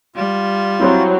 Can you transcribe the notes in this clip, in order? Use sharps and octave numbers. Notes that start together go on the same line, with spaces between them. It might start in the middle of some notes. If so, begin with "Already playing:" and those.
G3 F4
F#3 C4 E4 C#5